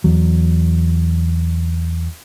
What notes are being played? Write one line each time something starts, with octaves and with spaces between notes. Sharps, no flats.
E2 F#3